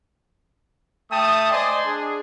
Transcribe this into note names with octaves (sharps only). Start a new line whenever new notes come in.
A3 G5 A5 D#6
C5 D5 D#5 G#5 C6
D4 G#4